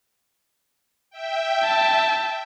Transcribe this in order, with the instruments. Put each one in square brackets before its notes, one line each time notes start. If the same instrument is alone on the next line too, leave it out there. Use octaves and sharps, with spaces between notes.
[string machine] E5 G5
[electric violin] A5